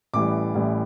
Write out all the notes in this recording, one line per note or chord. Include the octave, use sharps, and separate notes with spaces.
A1 A2 E3 G3 D6
A1 A2 E3 G3